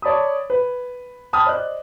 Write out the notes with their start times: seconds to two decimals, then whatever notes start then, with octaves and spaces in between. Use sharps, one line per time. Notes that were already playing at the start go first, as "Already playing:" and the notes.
0.02 C#5 D5 A5 B5 D#6
0.50 B4
1.33 G5 A5 B5 D#6 F6
1.46 C5 D5 D#5 F#6